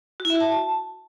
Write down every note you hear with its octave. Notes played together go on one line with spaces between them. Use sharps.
F#4
E4
E5
F#4
A5